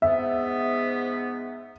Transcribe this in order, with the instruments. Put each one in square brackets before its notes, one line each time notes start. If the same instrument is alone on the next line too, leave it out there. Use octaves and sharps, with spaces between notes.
[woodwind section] G#2 B3 [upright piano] E5